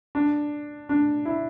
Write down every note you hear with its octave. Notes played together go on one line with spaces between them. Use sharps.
D4
D4
E4